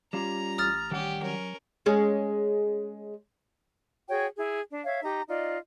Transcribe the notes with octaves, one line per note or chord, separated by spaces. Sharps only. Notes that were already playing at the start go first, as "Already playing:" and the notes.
G3 C#4 F4 G4 A#5
A1 D#6 F6 A6
D#3 G3 C#4 G4 F#5
F#3 C#4 A#4
G#3 C#4 G#4
F#4 G#4 C#5 G5
E4 G#4
D4
C#5 E5 F5
D#4 G4 A#5
D#4 F4 D5 D#5